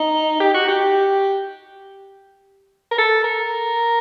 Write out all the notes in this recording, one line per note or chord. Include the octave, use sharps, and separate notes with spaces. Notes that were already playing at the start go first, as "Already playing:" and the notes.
Already playing: D#4
G4
F#4
G4
A#4
A4
A#4